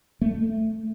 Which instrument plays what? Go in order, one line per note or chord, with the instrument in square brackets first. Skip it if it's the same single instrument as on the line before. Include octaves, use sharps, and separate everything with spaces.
[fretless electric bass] A3